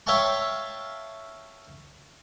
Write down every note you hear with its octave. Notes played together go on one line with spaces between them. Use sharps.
C#5 E5 F5 G5 A5 C#6